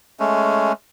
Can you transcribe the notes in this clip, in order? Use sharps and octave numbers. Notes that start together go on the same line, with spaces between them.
G#3 A3 C#4